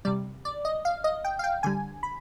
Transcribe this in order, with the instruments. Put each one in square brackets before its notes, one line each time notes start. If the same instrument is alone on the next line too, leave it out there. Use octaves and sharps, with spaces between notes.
[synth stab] C3 G3 D5
D5
D#5
F5
D#5
G5
F5
G5
D3 G3 G#5
B5